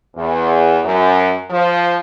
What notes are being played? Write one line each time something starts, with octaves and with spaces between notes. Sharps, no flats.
E2
F#2
F3